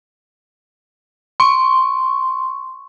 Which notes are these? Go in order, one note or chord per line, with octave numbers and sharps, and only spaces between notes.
C6 C#6